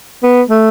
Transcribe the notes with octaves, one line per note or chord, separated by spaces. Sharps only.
B3
A3